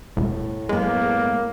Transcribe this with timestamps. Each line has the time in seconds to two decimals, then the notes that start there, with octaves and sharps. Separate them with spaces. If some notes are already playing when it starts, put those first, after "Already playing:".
0.17 E1 A2
0.69 F#2 G#3 A#3 B3